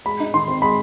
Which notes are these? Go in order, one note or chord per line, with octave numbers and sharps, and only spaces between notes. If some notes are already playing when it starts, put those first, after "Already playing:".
G#3 B5
D#4
D#3 C6
C4
G#3 B5